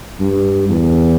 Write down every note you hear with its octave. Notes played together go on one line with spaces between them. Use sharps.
G2
E2